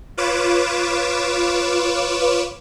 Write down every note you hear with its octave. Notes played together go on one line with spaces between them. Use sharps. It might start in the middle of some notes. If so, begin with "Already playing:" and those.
F4 B4 C#5 D6 E7